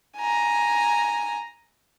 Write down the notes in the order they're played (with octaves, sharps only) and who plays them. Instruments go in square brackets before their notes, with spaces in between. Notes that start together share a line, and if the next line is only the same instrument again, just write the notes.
[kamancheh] G#5 A#5